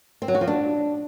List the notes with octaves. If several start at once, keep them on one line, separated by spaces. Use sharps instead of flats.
C4
F#3
F#4
F3
D4